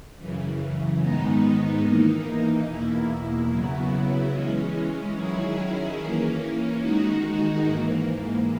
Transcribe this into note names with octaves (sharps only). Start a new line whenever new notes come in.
F#2 C#3 E3
G#2 D#3 G#3 B3 D#4
E3 A#3 D#4
E2 B2 A#3 E4
C#3 F#3 B3 E4
E3 G#3 C#4
D#3 F#3 C#4 E4 G#4
E3 A#3 C#4
D#3 G#3 D#4 F#4
G#2 E3 A#3